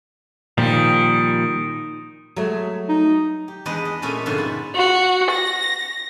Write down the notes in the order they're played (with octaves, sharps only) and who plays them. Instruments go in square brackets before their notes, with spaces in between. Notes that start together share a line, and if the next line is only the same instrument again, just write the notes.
[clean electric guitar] A#2 F3 G3 [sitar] D#3
[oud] F#3 G#3 A3
[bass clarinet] D#4
[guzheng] G4
E2 G#3 D4 B4 D#5
D#5
A#2 A3 C#4 A4 E5 G#5
F2 G#2 B2 D3 F4 E5
E4
[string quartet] F#4
A#6